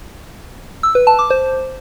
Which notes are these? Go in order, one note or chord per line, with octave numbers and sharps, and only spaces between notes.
E6
B4
A5
D6
C5